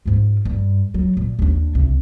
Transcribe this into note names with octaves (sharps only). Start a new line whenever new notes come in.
G#2 F4
G2
F#3
A#2
D#2 D4
C2